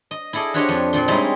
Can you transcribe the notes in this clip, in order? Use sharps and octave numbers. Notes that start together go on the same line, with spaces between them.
D#5
E4 G#4 A4 D5 D#5
D4 F#4 G4 C5 C#5 D#5
F2
A#2 F3 C6
G3 G#3 C4 C#4 D#4 E4